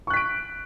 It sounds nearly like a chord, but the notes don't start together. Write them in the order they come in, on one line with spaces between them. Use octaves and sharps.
C#6 F#6 B6 D7